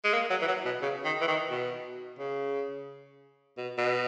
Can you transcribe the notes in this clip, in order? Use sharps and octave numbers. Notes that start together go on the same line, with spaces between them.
G#3
A#3
F#3
E3
F#3
B2
C#3
D#3
E3
D#3
B2
C#3
B2
B2